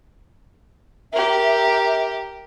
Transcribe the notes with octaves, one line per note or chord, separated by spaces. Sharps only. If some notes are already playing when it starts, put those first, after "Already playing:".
G4 A#4 E5